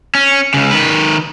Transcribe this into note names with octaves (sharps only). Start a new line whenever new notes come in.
C#4
C#2 C#3
D#3 B4